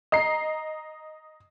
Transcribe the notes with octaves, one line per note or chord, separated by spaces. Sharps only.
D#5 A#5 C7